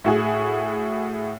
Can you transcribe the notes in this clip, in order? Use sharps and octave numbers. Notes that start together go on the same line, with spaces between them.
A2 F#4 G#4